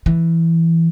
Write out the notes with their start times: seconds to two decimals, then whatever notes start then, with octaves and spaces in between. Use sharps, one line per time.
0.06 E3